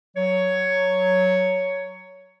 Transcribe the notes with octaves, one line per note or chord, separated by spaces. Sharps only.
F#3 C#5